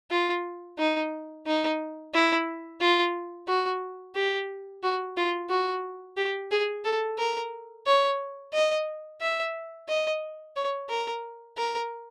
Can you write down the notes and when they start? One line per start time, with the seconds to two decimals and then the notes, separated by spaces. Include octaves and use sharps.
0.11 F4
0.78 D#4
1.47 D#4
2.14 E4
2.81 F4
3.48 F#4
4.15 G4
4.83 F#4
5.17 F4
5.50 F#4
6.17 G4
6.51 G#4
6.85 A4
7.19 A#4
7.87 C#5
8.53 D#5
9.21 E5
9.89 D#5
10.56 C#5
10.90 A#4
11.57 A#4